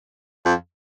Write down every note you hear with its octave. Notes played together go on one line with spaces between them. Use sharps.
F2